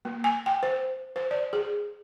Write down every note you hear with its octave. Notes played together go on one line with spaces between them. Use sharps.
A#3
G#5
G5
C5
C5
D5
G#4